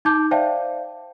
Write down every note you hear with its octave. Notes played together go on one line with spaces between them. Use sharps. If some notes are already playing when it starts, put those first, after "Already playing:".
D#4 A5 D6 G6
C5 D5 E5 F5 G5 A5